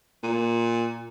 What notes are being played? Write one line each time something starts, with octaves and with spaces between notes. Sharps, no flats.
A#2